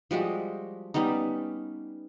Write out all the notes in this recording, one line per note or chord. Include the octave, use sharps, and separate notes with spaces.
F3 G3 G#3 F#4
G3 B3 C#4 D#4